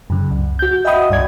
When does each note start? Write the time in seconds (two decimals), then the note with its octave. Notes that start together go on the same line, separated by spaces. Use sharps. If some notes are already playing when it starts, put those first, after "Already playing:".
0.10 F#2 C#3
0.31 C#2
0.59 F#4 G6
0.85 D#5 E5 F#5 G5 B5 D#6
1.10 C#2 G2 D5 G#6